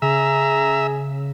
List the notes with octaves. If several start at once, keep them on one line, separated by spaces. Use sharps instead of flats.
C#3 G#4 E5 A#5